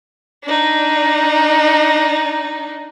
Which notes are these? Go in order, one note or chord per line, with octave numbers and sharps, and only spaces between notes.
D4 D#4